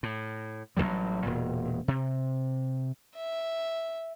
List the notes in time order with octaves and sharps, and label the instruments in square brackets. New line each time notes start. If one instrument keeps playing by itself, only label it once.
[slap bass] A2
A1 D3 F#3 G3
E1 A#2
C3
[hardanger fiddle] E5